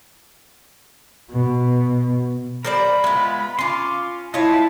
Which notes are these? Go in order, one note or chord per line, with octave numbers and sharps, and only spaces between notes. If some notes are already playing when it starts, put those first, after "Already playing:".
B2
G3 A#4 C5 D5 B5
G#3 B3 E4 F4
C#4 F4 C6 D6
E4 F4 C#5 D#5 A5